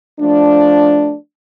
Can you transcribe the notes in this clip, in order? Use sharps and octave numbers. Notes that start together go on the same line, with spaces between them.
F3 A3 D4